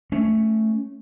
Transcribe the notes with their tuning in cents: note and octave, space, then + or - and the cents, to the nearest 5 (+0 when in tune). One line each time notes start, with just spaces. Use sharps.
A3 +0 C#4 +0